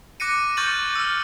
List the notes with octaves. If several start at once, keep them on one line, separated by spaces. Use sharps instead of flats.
D6 F#6 A#6 C#7 D#7
C#6 F6 G6 A6 C#7 F#7
E6 F6